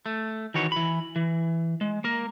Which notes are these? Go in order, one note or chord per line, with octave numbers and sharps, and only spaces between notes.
A3
D#3 E3 F#4 C#5
E3 B5
E3
G#3
A#3 A#4